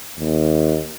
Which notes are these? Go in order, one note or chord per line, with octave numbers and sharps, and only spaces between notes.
D#2